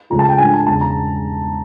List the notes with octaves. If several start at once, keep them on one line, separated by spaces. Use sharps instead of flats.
C#2 C#3 F3 A3 A#5
A5
G5
G#2 F3 A3 D4 G#5
A5
E1 E2 C#3 A5
A#5